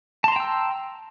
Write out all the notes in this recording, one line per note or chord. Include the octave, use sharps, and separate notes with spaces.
G5 A5 A#5 C6 E6